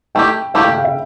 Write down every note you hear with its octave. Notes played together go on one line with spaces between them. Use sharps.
A3 E4 G4 G5
A3 E4 G4 F5
G5
F5
E5